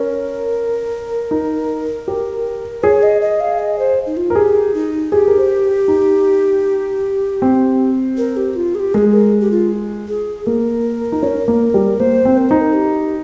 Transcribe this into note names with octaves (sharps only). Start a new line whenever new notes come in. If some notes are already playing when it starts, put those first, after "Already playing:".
Already playing: C#4 A#4
D#4
G4
G#4 C#5
D#5
D#5
F5
D#5
C5
D#4
F4
A#4
G4 G#4
D#4
G4 G#4
A#4
C5
D#4
C4
A#4
G4
F4
G#4
G4
G#3 G#4 A#4
A#4
G4
F4
G#4
A#3 A#4
D#4
C#4
A#3
G3
A#3 C5
C4
A#4
D#4 C5
A#4
G4